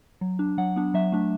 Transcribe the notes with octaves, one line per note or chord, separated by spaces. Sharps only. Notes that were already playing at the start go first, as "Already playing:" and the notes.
F#3
D4
F#3 F#5
B3 D4
F#3 E5
A3 D4